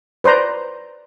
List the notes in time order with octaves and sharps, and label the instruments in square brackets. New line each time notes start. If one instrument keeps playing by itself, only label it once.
[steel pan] B4 C5 D5 A#5